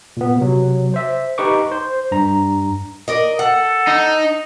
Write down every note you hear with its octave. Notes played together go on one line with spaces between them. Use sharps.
A#2 B3
C3 F#3
C5 E5
D#4 G4 B4 C#6 D6
C5
G2 A#5
A#4 D5 D#5
A4 F#5
D#4